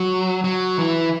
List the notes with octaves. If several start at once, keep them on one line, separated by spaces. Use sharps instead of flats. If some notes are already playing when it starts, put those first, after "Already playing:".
Already playing: F#3
F#3
E3